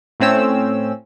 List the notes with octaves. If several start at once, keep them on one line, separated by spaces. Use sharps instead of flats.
A2 A3 C4 C#4 E6